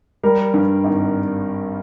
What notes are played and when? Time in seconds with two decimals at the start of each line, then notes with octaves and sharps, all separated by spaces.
0.23 G3 A#4
0.54 G2
0.84 G#1